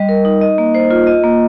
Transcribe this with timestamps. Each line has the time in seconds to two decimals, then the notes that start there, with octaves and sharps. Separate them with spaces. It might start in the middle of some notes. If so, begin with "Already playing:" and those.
Already playing: G3 D#5
0.09 A#4
0.25 D#4
0.41 D#5
0.58 A#3
0.75 C5
0.91 F4
1.07 D#5
1.24 A#3